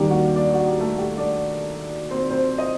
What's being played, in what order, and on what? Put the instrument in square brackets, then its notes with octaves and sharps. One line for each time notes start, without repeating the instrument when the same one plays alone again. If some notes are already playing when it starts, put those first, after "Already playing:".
Already playing: [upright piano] D#2 D#3 G3 A#3 D4 G4
F#4
D4 D5
F#4
G4
A3 A4
G4
D4 D5
C4 C5
C4 C5
D#5